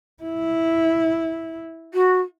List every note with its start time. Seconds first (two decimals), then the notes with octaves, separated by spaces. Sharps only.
0.23 E4
1.94 F#4